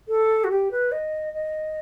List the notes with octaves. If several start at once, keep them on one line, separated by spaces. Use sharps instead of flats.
A4
F#4
G4
B4
D#5
D#5